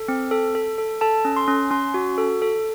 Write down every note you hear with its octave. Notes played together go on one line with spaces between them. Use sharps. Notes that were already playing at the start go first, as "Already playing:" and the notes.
Already playing: A4
C4
A4
A4
A4
A4 A5
C#4
C6
C#4
C#4 C6
F#4
A4
A4